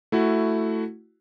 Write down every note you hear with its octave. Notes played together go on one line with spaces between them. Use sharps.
A3 E4 F#4